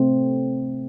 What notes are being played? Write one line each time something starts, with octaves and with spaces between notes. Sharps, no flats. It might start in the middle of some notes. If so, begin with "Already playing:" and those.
Already playing: C3 A3 C4